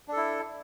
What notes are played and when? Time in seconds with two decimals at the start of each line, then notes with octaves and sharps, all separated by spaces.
0.08 D4
0.12 A4
0.17 E4